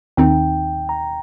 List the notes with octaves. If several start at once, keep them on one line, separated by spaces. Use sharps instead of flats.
D#2 D#3 C4 D#4 G5
A#5